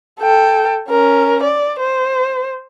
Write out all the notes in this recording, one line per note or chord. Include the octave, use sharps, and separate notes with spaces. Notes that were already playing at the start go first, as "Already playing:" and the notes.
A4 G5
C#4 A#4
D5
C5